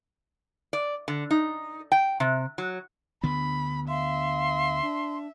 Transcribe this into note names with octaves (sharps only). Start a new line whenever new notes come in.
D5
D3
D#4
G5
C3
F#3
D2 D3 B3 B5
E5 F5 C6
D4